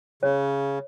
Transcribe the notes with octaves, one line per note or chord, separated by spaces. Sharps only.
C#3 C#5